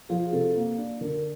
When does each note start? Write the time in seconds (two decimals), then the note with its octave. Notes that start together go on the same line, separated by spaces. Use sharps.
0.09 F3 G#4
0.32 C3 A4
0.56 A#3
0.78 D4
1.01 D3 A#4